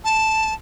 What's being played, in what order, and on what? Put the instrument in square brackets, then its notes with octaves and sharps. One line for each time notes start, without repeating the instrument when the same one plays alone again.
[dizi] A5